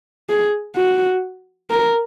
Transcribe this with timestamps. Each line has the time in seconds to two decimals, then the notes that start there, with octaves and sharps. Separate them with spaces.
0.29 G#4
0.76 F#4
1.71 A#4